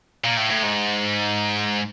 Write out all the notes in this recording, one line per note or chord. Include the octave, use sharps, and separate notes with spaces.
A#2
A2
A2
G#2